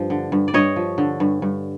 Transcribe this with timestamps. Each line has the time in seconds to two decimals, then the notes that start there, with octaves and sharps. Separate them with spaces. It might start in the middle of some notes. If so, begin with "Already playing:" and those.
Already playing: G2 F3
0.10 D3
0.32 G2
0.48 D5
0.54 G2 C#5 D#5
0.76 F3
0.98 D3
1.20 G2
1.42 G2